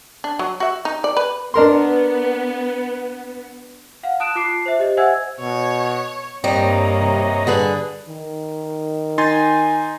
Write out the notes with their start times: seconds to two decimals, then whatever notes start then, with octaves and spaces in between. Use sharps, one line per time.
0.24 D4
0.39 F#3
0.60 F#4 E5
0.85 D#4
1.04 D5
1.17 B4
1.54 B3 D4 A#4 C6
4.03 F5 F#5
4.20 A5 D#6 F#6 D7 E7
4.35 F4 A5 D6 F#6 C7
4.66 C5 E5
4.79 G4 C5 D#5
4.97 C5 E5 F#5 G#5 E6 G#6
5.40 B2 C#5
6.44 G2 G3 A#3 C4 C#5 D#5 A#5
6.99 C3
7.47 D3 G3 G#4 B4
8.08 D#3
9.18 D#4 G#5 C6 A6